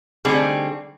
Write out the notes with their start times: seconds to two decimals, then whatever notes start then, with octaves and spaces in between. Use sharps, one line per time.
0.25 D3 G3 A3 C4 D#4 G#4